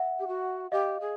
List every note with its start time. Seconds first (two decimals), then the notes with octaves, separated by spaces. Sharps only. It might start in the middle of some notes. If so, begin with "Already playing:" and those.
Already playing: E5 F#5
0.20 G4
0.28 F#4
0.72 G4 D#5 F5
1.01 G#4